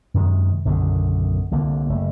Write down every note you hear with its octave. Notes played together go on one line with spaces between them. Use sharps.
F#2 C3 D#3 G#3
B1 F#2 D3 D#3
C2 D3 A#3
F#1 A3